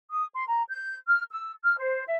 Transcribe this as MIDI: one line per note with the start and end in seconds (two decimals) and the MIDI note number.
0.10 0.26 87
0.34 0.43 84
0.47 0.63 82
0.69 0.95 91
1.06 1.23 89
1.31 1.52 88
1.63 1.75 89
1.78 2.02 72
2.06 2.18 76